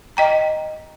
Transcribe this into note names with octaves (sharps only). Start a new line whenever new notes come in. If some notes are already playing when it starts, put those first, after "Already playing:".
D#5 G5 A#5